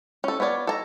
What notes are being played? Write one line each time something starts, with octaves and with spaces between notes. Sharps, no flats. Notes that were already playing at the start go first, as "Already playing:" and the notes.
C#4 A4
B3 F4 C#5 D5
A4 A5 A#5